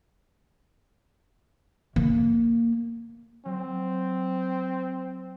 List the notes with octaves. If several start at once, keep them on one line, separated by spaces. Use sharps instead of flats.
A#3
F#3 C4